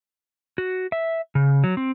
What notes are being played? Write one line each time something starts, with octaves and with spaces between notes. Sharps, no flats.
F#4
E5
C#3
F#3
C4